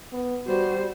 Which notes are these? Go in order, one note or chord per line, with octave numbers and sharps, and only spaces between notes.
B3
G3 F#4 C5